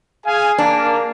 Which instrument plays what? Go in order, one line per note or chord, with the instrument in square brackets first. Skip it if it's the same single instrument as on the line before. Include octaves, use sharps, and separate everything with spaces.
[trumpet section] G#4 F5 G#5
[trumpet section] A#3 [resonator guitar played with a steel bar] D4